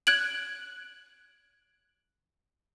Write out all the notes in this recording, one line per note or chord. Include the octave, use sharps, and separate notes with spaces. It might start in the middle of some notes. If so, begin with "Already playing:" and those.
F#6 G#6 D7 F#7